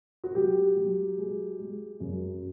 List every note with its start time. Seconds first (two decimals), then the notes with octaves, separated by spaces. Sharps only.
0.24 F#4
0.35 F#3 G4
0.76 F#3
1.18 G#3
1.59 G#3
2.00 F#2